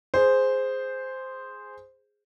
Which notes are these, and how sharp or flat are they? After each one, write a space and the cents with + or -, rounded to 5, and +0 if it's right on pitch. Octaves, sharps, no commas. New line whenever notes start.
G#4 +0 C5 -5